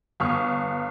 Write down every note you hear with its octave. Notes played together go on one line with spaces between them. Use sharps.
G1 C#6 D#6 F6